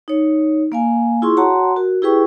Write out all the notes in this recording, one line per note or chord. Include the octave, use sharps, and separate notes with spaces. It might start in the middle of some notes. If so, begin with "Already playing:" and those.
D#4 C#5
A#3 F5 G#5
E4 F4 G#4 C6 C#6
F#4 C#5 F#5 A5 A#5 C6
F#4 A#4
E4 G4 G#4 B4 G5 C#6